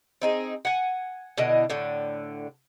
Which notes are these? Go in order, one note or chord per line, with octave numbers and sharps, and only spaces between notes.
C4 D#4 G#4
F#5 G#5
B2 D3 E4 D#5
A2 D3